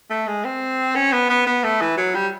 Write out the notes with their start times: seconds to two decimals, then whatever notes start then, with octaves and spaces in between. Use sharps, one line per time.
0.10 A3
0.27 G#3
0.45 C4
0.95 C#4
1.12 B3
1.30 B3
1.47 B3
1.64 A3
1.81 E3
1.97 F#3
2.14 G3